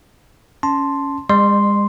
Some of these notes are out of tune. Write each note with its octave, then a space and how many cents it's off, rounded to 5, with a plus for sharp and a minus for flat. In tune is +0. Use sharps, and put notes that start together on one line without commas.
C#4 +5 A5 +0 C6 +0
G#3 -40 D5 +40 C6 +0